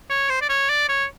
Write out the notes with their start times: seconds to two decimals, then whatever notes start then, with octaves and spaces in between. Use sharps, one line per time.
0.10 C#5
0.30 C5
0.42 D5
0.49 C#5
0.70 D5
0.89 C#5